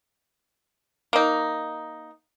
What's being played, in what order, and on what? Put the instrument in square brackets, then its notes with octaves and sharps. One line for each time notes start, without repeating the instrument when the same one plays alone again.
[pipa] A#3 D#4